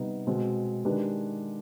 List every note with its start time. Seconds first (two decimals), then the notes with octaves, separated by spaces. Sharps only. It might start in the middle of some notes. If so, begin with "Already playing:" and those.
Already playing: C3 G3 B3 D#4
0.27 B2 G#3 C4
0.85 D#3 G#3 D4 G4 B4